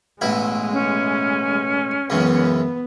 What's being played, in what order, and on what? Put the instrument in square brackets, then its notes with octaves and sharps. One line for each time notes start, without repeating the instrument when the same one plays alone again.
[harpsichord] A1 B2 E4 [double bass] G#3
[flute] C#4
[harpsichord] C#2 F#2 E3 [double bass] B3